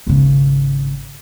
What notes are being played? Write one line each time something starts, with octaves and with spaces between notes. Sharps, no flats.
G#1 C#3